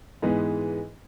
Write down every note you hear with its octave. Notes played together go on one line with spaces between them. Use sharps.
G#2 E3 G#3 B3